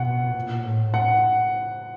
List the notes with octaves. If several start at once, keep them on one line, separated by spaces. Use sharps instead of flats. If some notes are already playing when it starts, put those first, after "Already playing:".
Already playing: B2 F#5
A#2
A2
F#5